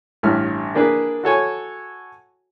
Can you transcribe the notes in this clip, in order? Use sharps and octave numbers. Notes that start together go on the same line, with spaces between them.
A1 G2 F6
A#3 D4 G#4 B4
F#4 A4 C#5 G#5